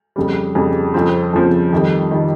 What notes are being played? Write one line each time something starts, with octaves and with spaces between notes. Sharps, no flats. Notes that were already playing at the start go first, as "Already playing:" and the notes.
F2 C#3 G3
F2 C#3 G3
F2 C#3 F3 C4
F2 C#3 F3 C4
F2 D#3 G3
D#3 G3